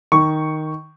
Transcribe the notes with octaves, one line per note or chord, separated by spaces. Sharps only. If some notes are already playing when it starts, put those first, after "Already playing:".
D#3 C#6